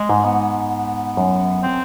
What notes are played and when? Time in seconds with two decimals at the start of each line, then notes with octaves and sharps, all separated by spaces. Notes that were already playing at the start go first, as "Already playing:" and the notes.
Already playing: G#3
0.09 G#2
0.24 B3
1.17 F#2
1.63 C4